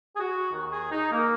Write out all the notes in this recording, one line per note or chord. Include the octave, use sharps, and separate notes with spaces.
G#4
F#4
D#2 D#3
G#4
D#4
A#3